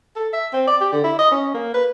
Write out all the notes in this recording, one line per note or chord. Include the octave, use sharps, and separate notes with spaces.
A4
E5
C4
D5
G4
D3
E4
D#5
C#4
A#3
B4